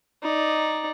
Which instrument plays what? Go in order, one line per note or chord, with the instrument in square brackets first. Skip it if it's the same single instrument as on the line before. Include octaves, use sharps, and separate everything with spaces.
[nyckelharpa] D#4 D5